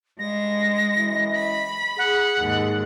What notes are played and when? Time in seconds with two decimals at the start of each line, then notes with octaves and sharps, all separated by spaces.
0.19 G2 G#3 A#6
0.97 F#2 E3 D#5
1.36 B5
1.98 G#4 F#5
2.39 D#2 G#2